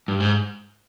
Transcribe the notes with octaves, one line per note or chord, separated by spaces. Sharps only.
G2
G#2